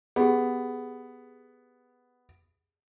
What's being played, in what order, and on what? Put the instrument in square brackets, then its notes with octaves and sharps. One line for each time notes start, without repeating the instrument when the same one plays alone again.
[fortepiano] B3 [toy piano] G4 G#4